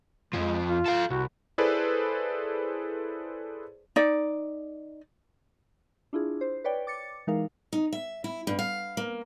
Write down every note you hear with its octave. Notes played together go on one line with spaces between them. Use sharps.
F2 F3 G#3
F4
A4 F5
C2 F#4
E4 G#4 A4 B4 C5 D5
D#4 D5
D4 E4 F4 G#4
C5
B4 C#5 D5 G5
D6 A6 C#7
E3 G#3 D#4 A#4 F5
D#4
E5
E4
G2
F5
A#3